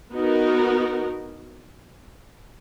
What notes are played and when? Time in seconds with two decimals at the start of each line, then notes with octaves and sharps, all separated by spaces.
0.13 B3 D#4 F#4 A#4